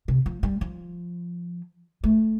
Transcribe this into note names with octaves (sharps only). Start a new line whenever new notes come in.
C3
F3
G3
F3
A3